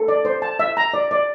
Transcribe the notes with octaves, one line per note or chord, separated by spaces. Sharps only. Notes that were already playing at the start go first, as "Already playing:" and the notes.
Already playing: A4
D5
C5
A5
E5
A#5
D5
D5